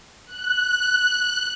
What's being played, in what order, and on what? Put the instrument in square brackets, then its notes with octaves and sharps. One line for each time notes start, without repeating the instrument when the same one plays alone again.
[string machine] F#6